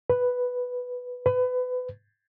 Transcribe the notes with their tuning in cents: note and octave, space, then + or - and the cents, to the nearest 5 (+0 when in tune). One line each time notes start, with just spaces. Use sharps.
B4 +0
B4 +25